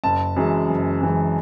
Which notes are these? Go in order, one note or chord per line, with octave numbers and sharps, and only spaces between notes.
F#1 A5
F#2 E3 G#3
F#1
F#2 E3 G#3